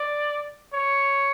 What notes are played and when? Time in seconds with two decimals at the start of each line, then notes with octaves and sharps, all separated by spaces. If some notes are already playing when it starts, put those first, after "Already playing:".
Already playing: D5
0.73 C#5